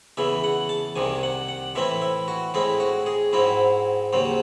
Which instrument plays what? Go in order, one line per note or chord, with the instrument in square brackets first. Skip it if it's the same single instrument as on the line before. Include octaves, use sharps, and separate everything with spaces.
[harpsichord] E2 C#3 E3 E5
F#5
A5
C2 C3 D#3 G#5
F#5
F#5
A2 E3 C4 E4 E5
E5
F#4
A2 G#3 C4 E4
F#4
G#4
G#2 F#3 C4 E4
D#2 C#3 F#3 C4